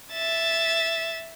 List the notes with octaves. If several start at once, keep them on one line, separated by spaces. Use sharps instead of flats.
E5 A6